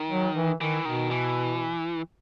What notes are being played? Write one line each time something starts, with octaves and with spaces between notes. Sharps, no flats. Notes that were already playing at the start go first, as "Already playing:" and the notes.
Already playing: D#3
F#3
E3
D#3 E3
B2 D#3
E3